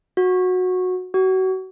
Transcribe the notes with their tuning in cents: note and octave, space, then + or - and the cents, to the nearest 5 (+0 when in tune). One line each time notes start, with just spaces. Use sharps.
F#4 -15
F#4 +30